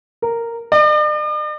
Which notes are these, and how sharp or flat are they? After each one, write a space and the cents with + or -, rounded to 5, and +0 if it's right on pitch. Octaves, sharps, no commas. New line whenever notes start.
A#4 -10
D5 +45